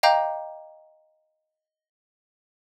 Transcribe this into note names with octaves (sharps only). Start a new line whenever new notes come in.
D#5 F5 G5 A#5 D6 G6